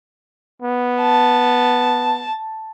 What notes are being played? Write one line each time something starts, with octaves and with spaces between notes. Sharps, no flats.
B3
A5